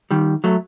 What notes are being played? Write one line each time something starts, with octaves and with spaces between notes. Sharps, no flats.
D#3 G3
F#3 A3